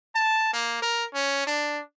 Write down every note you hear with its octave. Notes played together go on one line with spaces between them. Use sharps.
A5
A#3
A#4
C#4
D4